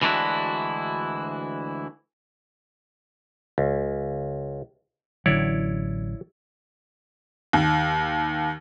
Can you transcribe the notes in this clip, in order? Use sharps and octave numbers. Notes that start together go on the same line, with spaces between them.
D2 E3 G#3 D4 E4 F#4
C#2
A1 D3 F#3 E4 C#5 D5
D#2